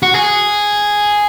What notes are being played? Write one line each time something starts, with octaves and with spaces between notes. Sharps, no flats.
F#4
G#4